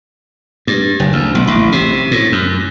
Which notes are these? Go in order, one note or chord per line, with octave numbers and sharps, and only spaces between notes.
G2
F#1
D2
B1
A1
C3
A2
F#2